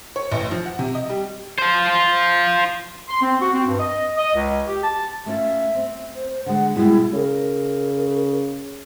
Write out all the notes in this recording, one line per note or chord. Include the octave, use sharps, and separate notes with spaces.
C#5
A1
F3
F#5
C3
D#5
G3
F4 C5
C6
C4
F#4
C4
G2
D#5
D#5
C#2
G4
A5
A3 C#4 F4 E5
C4
C5
D3 G#3 F#5
B2 G3 G#3 E4
C#3 A#4